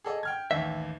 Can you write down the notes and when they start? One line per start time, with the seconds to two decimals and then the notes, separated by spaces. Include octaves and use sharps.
0.04 G#4 A4 D#5
0.23 G5 F6 G#6
0.51 A1 D#2 E5